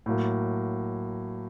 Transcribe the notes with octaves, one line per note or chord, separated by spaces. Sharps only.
A2 F#3 A#3